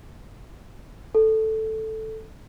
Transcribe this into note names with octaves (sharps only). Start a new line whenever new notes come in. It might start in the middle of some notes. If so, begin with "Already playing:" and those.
A4